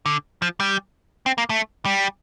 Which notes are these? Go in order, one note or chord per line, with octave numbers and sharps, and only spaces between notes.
D3
F3
G3
C4
A#3
A3
G3